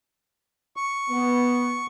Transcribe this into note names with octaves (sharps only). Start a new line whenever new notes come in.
C#6
B3